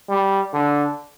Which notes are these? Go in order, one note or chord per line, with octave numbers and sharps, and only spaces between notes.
G3
D3